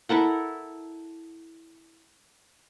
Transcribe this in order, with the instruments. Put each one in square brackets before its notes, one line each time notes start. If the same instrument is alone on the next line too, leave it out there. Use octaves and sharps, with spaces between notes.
[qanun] E4 A4 A#4 F#5